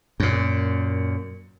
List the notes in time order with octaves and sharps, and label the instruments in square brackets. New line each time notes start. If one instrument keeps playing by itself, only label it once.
[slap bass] F#2 A#2